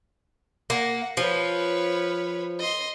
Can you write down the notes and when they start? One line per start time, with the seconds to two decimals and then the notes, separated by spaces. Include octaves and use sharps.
0.70 A#3 F#5
1.17 F3 B4 C#5
2.59 D#5 C6